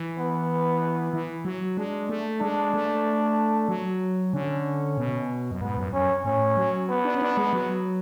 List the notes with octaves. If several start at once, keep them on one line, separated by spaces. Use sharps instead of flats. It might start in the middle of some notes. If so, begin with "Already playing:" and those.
Already playing: E3
B3
E3
F#3
G#3 D4
A3
G#3 D4
A3
F#3
D3 C#4
B2
F#2
G#2 B3
F#2
F#2 C#4
A2 C#4
F#3
B3
D4
C#4
D4
G#3
F#3